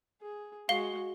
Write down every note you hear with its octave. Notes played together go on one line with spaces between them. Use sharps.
G#4
G#3 F#4 F5 G7